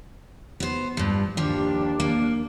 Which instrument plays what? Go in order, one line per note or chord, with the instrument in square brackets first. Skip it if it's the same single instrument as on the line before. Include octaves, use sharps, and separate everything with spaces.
[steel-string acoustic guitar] B3 C5
G2 F3
[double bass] D#2 D4 [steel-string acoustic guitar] F3 G4
[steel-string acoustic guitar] A#3